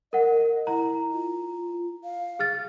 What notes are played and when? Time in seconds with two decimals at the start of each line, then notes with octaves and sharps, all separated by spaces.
0.13 A#4 D#5 F#5
0.67 E4 A#5
1.12 F4
2.04 F5
2.39 G#4 F6 A6